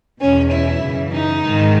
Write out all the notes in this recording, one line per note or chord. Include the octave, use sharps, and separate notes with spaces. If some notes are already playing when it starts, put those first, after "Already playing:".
E2 B2 C#4
E4
F#2 C#3 E3
D#4
G#2 D#3